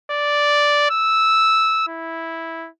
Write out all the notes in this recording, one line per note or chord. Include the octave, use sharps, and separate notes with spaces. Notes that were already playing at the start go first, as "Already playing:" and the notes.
D5
E6
E4